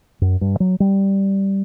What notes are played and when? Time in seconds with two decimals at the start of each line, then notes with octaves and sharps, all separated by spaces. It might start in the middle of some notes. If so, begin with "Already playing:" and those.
0.21 F#2
0.41 G2
0.60 F#3
0.80 G3